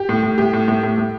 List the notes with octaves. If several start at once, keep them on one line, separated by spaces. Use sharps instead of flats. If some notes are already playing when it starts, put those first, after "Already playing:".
Already playing: G4
A2
A2
A2 G4
A2
A2
A2
A2